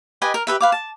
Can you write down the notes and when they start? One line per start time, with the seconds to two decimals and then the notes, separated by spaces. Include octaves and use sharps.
0.22 G4 B4 D#5 G#5
0.34 A#4
0.47 G4 A4 B4 E5
0.61 B4 F5 D6
0.72 A5